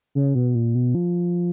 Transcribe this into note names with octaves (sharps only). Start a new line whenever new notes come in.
C#3
B2
A#2
B2
F3